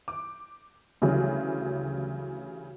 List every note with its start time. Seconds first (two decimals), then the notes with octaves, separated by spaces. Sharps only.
0.08 D6
1.02 D2 C#3 E3 F#3 G3